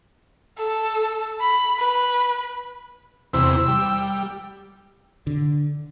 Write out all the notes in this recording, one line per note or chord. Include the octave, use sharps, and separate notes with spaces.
A4
B5
B4
E2 C3 E6
G3
D3